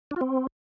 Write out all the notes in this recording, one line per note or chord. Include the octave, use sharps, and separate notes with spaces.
D4
F4
C4